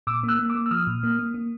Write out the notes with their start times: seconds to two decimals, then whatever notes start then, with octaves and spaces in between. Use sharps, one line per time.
0.07 A#2 D6 E6
0.23 A#3
0.28 E6 F#6
0.39 A#3
0.50 D6 E6
0.55 A#3
0.66 E6
0.71 F3 D#6 F6
0.87 A#2
1.03 A#3
1.19 A#3
1.34 A#3